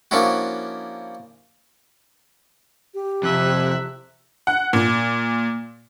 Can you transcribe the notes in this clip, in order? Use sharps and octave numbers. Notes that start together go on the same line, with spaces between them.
F3 A#3 C#4 D4 E4 F#4
G4
F2 C3 E5 F#6
F#5
A#2